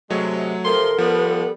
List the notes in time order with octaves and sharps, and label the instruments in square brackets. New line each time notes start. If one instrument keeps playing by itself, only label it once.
[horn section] C3 G#3 [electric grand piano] F#3 A3 C#5
[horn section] C3 F3 C6 [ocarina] A4 [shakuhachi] A#4
[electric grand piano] F3 [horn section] G3 B3